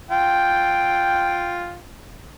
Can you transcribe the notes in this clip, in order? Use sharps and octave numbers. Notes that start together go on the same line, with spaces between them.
F4 G5